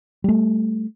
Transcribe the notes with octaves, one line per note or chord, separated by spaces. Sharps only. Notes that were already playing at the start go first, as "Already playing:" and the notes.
G3 A3